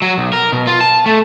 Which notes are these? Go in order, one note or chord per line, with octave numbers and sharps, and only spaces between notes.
F#3
B1
A#4
B2
F4
A5
A3